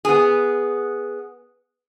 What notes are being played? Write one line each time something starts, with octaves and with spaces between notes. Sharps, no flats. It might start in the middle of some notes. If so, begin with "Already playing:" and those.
B3 G#4